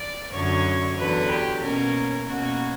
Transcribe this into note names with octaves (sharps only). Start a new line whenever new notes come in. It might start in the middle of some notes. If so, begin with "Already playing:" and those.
Already playing: D5
F#2 D3 F#3 C#4 C#5
E2 D3 F#3 B4
G4
B2 A#3 C#4 A#4
B2 A#3 C#4 F#4